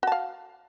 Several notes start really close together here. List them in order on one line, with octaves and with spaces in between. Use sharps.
F#4 A5 F5